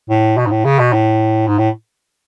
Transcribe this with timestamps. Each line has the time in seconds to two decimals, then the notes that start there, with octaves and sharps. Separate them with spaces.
0.09 A2
0.37 B2
0.46 G#2
0.51 A2
0.65 C#3
0.79 B2
0.93 A2
1.47 G#2
1.59 A2